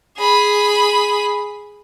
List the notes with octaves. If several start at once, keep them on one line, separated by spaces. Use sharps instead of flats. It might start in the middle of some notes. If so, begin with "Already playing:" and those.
G#4 B5